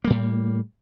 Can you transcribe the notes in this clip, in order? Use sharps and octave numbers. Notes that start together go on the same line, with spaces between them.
A2 G3 A#3